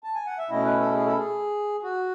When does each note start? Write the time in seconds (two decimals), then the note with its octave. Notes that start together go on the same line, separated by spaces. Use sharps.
0.04 A5
0.15 G#5
0.27 F#5
0.38 E5
0.50 B2 A3 C#4 E4 D#5
0.64 B4
0.80 A4
0.94 G#4
1.06 A4
1.17 G#4
1.83 F#4